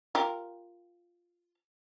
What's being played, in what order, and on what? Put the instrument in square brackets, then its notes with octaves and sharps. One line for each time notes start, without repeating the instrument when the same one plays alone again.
[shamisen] F4 G4 A#4